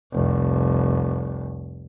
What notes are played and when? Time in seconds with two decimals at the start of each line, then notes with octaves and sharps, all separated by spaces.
0.13 F1 C2